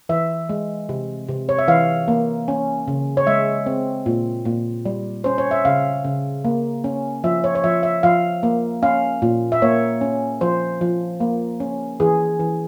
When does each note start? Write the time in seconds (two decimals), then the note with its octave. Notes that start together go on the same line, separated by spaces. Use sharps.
0.09 E3 E5
0.49 G#3
0.89 C3
1.29 C3
1.49 C#5
1.59 E5
1.68 E3 F5
2.08 A#3
2.48 C#4
2.88 C#3
3.17 C#5
3.27 G#3 E5
3.66 C4
4.06 A#2
4.45 A#2
4.86 G3
5.24 C#4 C5
5.38 C#5
5.51 E5
5.65 C#3 F5
6.05 C#3
6.45 A#3
6.84 C#4
7.24 F3 E5
7.44 C#5
7.55 C#5
7.64 F3 E5
7.83 E5
8.03 F3 F5
8.43 A#3
8.83 C#4 F5
9.22 A#2
9.52 E5
9.62 A#3 C#5
10.01 C#4
10.41 F3 C5
10.81 F3
11.20 A#3
11.60 C#4
12.00 E3 G#4
12.40 E3